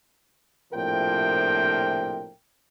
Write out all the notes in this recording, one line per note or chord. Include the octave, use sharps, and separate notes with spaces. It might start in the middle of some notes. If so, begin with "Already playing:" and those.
A#1 A2 C3 F3 A#4 G5